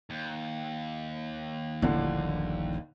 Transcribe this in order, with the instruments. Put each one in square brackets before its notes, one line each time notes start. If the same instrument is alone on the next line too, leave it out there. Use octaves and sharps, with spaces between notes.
[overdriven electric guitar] D#2
[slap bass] D#1 A#1 [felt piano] A2 D3